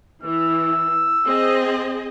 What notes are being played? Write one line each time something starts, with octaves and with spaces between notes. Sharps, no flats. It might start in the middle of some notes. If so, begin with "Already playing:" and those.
E3 E6
C4 G#4 D#5